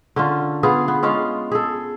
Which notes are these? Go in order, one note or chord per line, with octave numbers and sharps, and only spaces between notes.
D3 C#4 F4
B3 F4 G#4
B3
G#3 C#4 F4 F5
G#4 A4